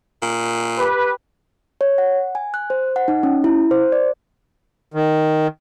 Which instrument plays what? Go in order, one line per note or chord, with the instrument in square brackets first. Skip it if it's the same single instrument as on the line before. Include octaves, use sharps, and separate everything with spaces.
[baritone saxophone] A#2
[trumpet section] G4 B4
[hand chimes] C#5
F#5
G#5
F#6
C5
F#5
D#4
C#4
E4
C5
D5
[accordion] D#3